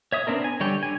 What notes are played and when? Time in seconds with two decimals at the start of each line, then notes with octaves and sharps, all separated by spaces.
0.12 C#5 E5 D#6
0.27 B3 C4 D4 A#4
0.44 G#5
0.60 D3 G3 C#5 G5
0.83 D3 G#5